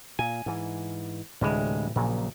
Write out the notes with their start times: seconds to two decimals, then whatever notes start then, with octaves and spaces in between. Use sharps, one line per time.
0.19 A#2 G#5
0.46 G#2 E3
1.41 D2 A2 C3 E3 G#3
1.96 A#1 A#2 C#3 F#3